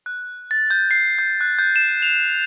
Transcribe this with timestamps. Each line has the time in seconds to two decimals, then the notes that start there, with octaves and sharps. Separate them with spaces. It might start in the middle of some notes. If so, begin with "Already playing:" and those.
0.06 F#6
0.51 A6
0.71 G6
0.91 C7
1.19 G6
1.41 F#6
1.59 G6
1.76 E7
1.88 D#7
2.02 F7